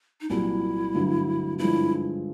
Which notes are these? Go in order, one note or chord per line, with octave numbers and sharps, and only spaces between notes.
D#4
C2 A#2 F#3 E4
G2 D3 F#3 A3 D4
G2 D3 F3 G#3 E4